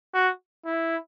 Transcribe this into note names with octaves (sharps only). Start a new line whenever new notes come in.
F#4
E4